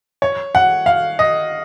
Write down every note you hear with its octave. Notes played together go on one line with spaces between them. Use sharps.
C#5
F#5
F5
D#5